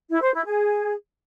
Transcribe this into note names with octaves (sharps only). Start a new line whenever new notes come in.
E4
C5
E4
G#4